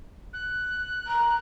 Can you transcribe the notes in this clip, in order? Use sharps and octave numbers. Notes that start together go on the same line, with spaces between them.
F#6
A#5